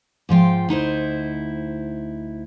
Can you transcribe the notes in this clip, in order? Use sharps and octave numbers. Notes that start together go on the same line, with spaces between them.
G#2 F3 F4 G5
D2 D#4 E4 C5